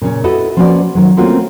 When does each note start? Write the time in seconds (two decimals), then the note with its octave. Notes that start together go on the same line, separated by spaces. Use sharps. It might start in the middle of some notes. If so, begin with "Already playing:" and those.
0.01 A#2 C#3 C#4
0.24 E4 F#4 A4 B4 D#5 E5
0.57 F3 A#3 C#4 F#4 B4 D5
0.95 D#3 F#3
1.17 A3 A#3 C4 C#4 F4 F#4